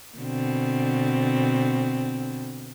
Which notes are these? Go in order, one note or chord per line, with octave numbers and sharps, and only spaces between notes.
B2 D3 C4